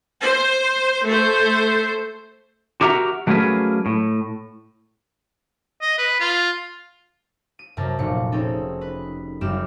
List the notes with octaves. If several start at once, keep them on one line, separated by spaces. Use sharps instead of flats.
C5
A3 C5
F#4 G4 A#4 E5 F#5 A#5
F#3 A3 A#3 C#4 G#4 B4
A2
D#5
B4
F4
D#7
F#2 C3 A#4 A5
F1 A#2 C#7
C4 C#4 D#4 G#4 A4
B4
F#1 F#2 G3 G4 F6 E7